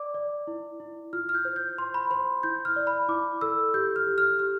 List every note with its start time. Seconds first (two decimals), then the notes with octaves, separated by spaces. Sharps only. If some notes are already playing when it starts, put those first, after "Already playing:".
Already playing: D5 D6
0.14 D5
0.47 E4
0.80 E4
1.13 F4 F6
1.29 F6
1.35 G6
1.45 C5
1.56 G6
1.78 C5 C6
1.94 B5
2.11 C5 C6
2.43 E4 G6
2.65 F6
2.76 D5
2.87 B5
3.09 E4 D6
3.41 A4 E6
3.74 G4 G6
3.96 F6
4.07 G4
4.18 F6
4.39 G4 F6